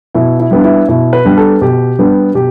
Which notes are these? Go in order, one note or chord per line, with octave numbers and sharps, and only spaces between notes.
B2 E4
E4
G3 B3 D4
E4
B2 E4
B4
G3 B3 D4
A4
B2 G4
G3 B3 D4
B2 G4